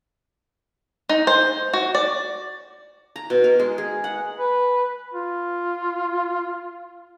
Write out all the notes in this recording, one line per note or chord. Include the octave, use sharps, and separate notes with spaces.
D#4
C5
F#4
D5
A#5
B2
A#4
G#3
G#4
F#5
B4
F4